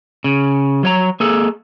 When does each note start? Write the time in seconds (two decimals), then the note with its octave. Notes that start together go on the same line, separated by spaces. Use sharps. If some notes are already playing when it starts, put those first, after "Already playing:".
0.24 C#3
0.83 F#3 C#5 A#5
1.20 A#3 G#4 A4